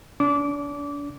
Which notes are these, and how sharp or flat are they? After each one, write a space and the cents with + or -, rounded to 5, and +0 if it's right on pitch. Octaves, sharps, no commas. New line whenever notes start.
D4 -35 D6 -20